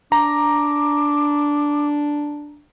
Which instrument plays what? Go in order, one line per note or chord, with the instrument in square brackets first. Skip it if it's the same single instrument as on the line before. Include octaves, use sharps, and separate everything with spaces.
[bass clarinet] D4 [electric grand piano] A#5 [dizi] D6